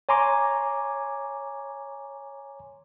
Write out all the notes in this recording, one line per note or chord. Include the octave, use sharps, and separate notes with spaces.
C#5 G#5 A#5 C6 D6